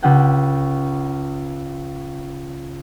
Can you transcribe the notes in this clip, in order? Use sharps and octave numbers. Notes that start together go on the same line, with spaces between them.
C#2 C#4 G4 F#5 G5